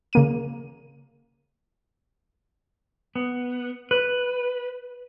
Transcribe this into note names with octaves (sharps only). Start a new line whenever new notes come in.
C#3 A#3 D#7
B3
B4